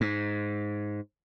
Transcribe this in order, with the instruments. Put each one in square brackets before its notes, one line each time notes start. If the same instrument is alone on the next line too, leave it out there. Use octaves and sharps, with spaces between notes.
[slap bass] G#2